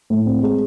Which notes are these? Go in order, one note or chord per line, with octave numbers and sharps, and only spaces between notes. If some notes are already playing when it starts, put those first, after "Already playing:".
A2
C4
G#3